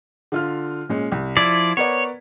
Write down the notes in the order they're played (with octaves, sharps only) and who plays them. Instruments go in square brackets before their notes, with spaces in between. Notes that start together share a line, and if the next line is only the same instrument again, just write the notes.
[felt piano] D3 F4 F6
A#2 G#3 C#4
C2
[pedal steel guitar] F3 E4 D5 [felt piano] G#6 B6
[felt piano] B3 A#4 D5 [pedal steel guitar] C#5